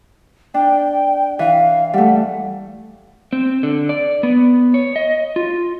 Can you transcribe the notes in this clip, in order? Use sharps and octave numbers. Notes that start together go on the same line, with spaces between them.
D4 G5
E3 F5
G3 A3 F#5
C4
D3
D5
B3
C#5
D#5
F4